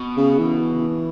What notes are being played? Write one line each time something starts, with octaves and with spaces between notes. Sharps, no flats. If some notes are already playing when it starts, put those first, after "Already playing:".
Already playing: B2
C#3
E3